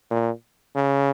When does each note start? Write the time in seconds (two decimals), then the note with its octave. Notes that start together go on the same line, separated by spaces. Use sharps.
0.11 A#2
0.75 C#3